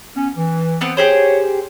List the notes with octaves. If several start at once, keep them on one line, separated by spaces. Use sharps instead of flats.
B3 C#4
E3
B3 C4 F#5
G4 G#4 C5 C#5